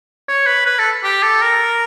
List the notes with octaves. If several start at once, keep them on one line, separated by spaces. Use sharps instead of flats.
C#5
B4
B4
A4
G4
A4
A#4